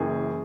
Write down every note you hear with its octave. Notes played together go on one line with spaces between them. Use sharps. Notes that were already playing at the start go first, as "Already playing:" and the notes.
Already playing: F#1 F#2 E3 G#4